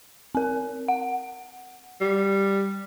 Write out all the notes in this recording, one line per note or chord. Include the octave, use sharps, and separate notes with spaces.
C4 A#4
F#5
G3